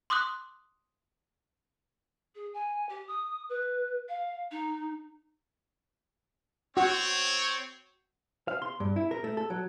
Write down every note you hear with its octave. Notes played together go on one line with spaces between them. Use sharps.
C6 D6 D#6 F#6
G#4
G#5
G4
D#6
B4
F5
D#4
C4 F#4 C#5
F5
C6
G2
E4
A#4
A3
A4
F#3